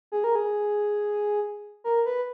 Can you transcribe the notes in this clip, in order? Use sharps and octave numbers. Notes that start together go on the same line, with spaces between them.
G#4
A#4
G#4
A#4
B4